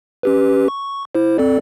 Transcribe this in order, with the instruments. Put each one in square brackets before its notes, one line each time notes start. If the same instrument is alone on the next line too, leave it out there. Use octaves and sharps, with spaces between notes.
[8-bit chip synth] C#4 G4 B4
C#6
E4 C5
C4 A4 D5